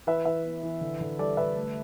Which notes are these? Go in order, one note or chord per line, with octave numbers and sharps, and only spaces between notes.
E3 B4 E5
E3 B4 E5
B3
E3
D3
D3
G3 A4 D5
D3 B4 E5
A3